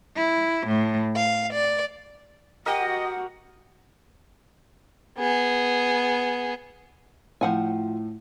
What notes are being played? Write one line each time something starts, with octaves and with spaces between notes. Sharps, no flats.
E4
A2
F5
D5
F#4 G4 A#4 D#5 F#5
B3 G#4
A2 F3 F#5 G#5